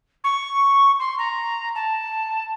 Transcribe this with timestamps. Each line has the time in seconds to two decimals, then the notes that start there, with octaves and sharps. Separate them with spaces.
0.24 C#6
0.99 C6
1.18 A#5
1.75 A5